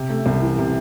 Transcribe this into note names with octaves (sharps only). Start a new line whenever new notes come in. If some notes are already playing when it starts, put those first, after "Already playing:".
Already playing: C3
A3
C2
E3
C3